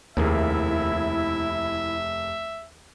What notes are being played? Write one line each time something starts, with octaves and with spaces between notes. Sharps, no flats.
F1 D#2 A#3 E4 G#4 E5